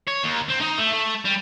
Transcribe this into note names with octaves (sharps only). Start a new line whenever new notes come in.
C#5
D#2
C4
D#4
A3
A3
G3